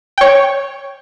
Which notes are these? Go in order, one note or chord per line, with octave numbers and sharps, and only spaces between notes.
C#5 G5